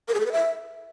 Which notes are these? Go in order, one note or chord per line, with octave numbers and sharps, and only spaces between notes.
A#4
G#4
A4
B4
E5